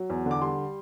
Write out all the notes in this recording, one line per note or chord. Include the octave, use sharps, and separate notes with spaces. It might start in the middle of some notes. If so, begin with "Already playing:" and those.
Already playing: F#3
E2
D3
D6
G3 C6